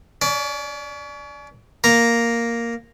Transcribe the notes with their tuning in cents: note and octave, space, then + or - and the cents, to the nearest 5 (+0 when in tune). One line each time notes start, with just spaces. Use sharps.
C#4 +35 D5 +0
A#3 +0 A#5 +0